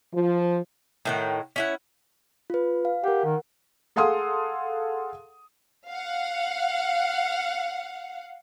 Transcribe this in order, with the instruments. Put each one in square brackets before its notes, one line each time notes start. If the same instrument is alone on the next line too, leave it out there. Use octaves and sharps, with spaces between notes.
[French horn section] F3
[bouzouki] A2 D#3 F#5
C#4 E4 F#5
[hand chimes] F4 B4
F5
[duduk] G4 [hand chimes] A#4 F#5
[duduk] D#3
[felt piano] G#4 A4 F5 F#5 C6 D#6
[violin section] F5 F#5